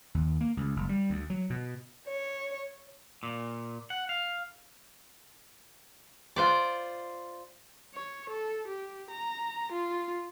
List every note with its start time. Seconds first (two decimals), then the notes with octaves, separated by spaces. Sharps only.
0.15 D#2
0.41 A#3
0.57 C#2
0.76 F#1
0.89 G3
1.10 D2
1.30 F#3
1.50 B2
2.07 C#5
3.23 A#2
3.90 F#5
4.09 F5
6.36 F4 C5 D5
7.95 C#5
8.29 A4
8.67 G4
9.10 A#5
9.72 F4